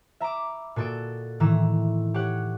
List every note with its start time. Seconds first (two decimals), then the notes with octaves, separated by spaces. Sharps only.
0.20 E5 A#5 B5 D6
0.76 A#2 F#4 A4 D#5 D7
1.40 A2 D#3 E3 A#5 E6
2.14 G4 C#5 F#5